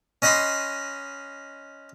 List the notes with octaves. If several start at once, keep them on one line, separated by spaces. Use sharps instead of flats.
C#4 D#5 F#5 B5 C6